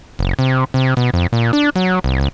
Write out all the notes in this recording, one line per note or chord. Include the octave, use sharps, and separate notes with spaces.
F#1
C3
C3
B2
F2
A#2
D4
F#3
C2
C#2